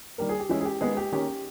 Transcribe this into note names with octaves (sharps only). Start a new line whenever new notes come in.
D#3 G3 A#3 A#4
G#4
G4
E3 G#3 C#4 E4
G#4
G4
D#3 G#3 B3 G#4
G4
D#3 A#3 C#4 G4